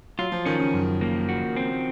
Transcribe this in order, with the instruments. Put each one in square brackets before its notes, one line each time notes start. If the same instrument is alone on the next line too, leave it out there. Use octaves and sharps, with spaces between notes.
[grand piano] F#3 [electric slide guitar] F4
[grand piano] F3
[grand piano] D#3 [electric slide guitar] C#4
[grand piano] C#3
[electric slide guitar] F#2
A#3
F#4
C4